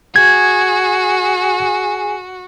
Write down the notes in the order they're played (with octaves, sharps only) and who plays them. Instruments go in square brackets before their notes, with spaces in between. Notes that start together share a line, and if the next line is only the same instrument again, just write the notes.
[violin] F#4 [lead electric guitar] G#4 [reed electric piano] G#6